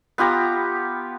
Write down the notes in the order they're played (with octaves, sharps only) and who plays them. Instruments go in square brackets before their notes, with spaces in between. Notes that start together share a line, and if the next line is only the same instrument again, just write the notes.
[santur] B3 F4 G4 A#5